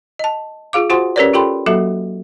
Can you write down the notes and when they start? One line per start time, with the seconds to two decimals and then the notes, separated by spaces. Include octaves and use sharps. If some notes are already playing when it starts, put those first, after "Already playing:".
0.19 D#5 A5
0.73 F4 G#4 F5 D6
0.90 F4 F#4 C5 F#5 G#5 C6
1.16 C#4 G4 A#4 B4 C#5 D5
1.34 F4 G4 A4 G5 B5 C6
1.66 F#3 A#3 F#4 A4 E5